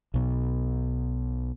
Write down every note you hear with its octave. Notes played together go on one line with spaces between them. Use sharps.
B1 B2